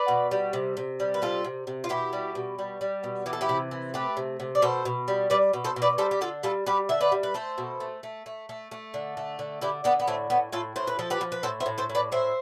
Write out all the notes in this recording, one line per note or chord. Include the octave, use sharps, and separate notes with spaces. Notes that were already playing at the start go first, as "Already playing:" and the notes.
Already playing: B4 D5
B2
G3
C3
C3
G3
B4
C3 F4 A4
C3
C3
F4
B2 E4 G4
G3
B2
G3
G3
B2
E3 G4
A4
E4 G4
C3
E3
A3 G4 B4
C3
C3
D5
B2 A4 C5
B2
G3
G3 B4 D5
B2
A4 C5
B2
B4 D5
G3 A4 C5
G4
D3 F4 A4
G3 F4 A4
G3 G4 B4
D3 E5
B4 D5
G3
B4
A3 A4 C5
B2
A3
A3
A3
A3
A3
D3
A3
D3
D3 E4 G4
D3 B3 D4
B3
A2 A3 C4
A2 B3
A2 F4 A4
A2 C5
B4
F3 A4
G4 B4
F3
B4
A2 A4 C5
C5 E5
A2
A4 C5
A2
B4 D5
A2 C5 E5